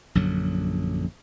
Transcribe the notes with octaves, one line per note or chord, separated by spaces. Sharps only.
A#1 F#2 D3 F#3